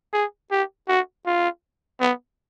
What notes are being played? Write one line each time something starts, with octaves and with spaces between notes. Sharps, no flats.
G#4
G4
F#4
F4
B3